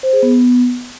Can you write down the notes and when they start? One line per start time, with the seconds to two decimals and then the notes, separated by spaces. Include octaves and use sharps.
0.03 C5
0.13 G#4
0.23 B3